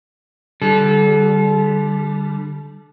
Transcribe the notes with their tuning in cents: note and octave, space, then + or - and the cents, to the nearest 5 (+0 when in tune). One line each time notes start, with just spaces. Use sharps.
D3 +15 G3 +0 A4 -30